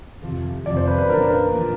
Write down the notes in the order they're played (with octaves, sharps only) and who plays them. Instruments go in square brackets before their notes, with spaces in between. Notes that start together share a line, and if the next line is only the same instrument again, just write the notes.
[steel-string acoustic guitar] F2 C3 F3
[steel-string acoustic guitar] F2 C3 F3 [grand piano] D5
[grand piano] C5
B4
B4
[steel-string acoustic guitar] A#2 F3 A#3 D4 [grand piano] A#4
[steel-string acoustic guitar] A#2 F3 A#3 D4